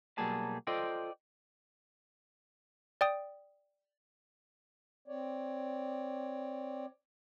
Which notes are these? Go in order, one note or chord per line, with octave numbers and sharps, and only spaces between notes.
B1 F#3 G3 A#3 G#4 A5
F4 A4 C5 D5 D#5 G5
D5 G5 D#6
C4 C#5 D5